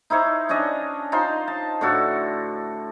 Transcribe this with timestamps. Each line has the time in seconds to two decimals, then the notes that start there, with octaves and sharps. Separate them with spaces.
0.10 D#4 E4 C5 C#5
0.49 C#4 D4 C#5 D#5
1.12 D#4 F4 C5 C6
1.48 A5
1.81 A2 D3 F#4 A4